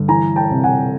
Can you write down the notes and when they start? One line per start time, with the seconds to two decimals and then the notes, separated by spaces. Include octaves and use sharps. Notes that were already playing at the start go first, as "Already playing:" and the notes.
Already playing: G2 D3
0.08 E3 G#5 A#5
0.36 G5 A5
0.51 C3
0.64 F#5 G#5